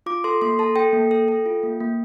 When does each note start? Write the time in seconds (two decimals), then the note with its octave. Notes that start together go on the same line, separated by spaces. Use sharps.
0.06 F4 D6
0.24 A4 C6
0.42 A#3 C6
0.59 A4 A5
0.76 A4 G5
0.93 A#3
1.11 A4
1.28 A4
1.46 F4
1.63 A#3
1.80 A#3